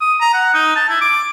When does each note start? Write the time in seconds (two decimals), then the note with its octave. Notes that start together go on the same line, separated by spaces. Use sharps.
0.01 D#6
0.20 A#5
0.34 F#5
0.54 D#4
0.76 A5
0.89 E4
1.01 D6